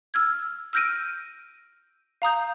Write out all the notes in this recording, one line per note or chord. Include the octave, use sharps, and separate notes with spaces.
E6 F6 G#6
E6 F6 G6 A#6 D7 D#7
F5 A#5 D#6 G6